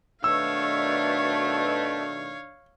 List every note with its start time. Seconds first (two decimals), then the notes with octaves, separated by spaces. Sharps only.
0.24 B2 D#3 A3 D4 C#5 F5 E6